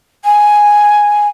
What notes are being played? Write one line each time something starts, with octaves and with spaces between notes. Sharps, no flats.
G#5